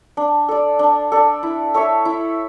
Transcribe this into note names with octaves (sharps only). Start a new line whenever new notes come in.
D4
A4 D5
D4
A4 D5
E4
A4 C#5 E5
E4